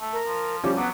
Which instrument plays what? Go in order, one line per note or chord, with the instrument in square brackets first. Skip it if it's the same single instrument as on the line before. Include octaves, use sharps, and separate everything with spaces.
[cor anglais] A3
[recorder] A#4
[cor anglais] F3
[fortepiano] F3 G3 C#4 [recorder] G4
[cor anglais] F#3 [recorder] B3 [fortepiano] D6